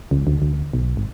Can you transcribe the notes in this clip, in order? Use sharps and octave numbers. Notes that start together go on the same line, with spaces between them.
C#2
D2
D2
B1
G#1